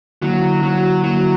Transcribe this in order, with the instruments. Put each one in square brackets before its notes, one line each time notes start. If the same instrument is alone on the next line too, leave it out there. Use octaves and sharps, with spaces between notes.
[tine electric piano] D3 A#3 E4 [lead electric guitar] F#3
[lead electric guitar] F#3
[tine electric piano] D3 A#3 E4 [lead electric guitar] F#3